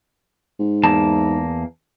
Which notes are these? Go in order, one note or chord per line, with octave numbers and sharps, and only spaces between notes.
G#2
E2 A#3 A5